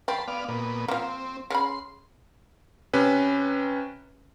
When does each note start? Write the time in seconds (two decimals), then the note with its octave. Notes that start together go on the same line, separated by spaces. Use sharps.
0.08 C4 A5 B5 C6
0.28 B3 D5 F5
0.48 A#2 B3
0.88 F3 A#3 C4
1.50 C#3 B5 C6
2.93 C3 C#4 B4